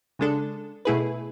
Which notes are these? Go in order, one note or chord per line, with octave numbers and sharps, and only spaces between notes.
C#3 G#3 D4 A4
B2 A3 E4 G#4 B4